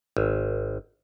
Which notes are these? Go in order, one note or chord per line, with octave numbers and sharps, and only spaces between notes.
G#1